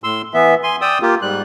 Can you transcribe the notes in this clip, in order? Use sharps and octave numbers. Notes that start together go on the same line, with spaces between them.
A2 C6 E6
E3 B3 E5
G#5 C6
D5 G5 D#6 E6
A#3 F4 G4
G#2 G3 F#6